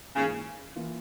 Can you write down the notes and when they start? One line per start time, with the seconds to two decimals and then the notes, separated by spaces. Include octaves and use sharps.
0.16 G#2 C#3 E3 A#3 F4
0.76 E3 A#3 F4